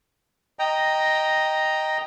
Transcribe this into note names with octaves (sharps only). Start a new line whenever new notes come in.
D#5 G5 A#5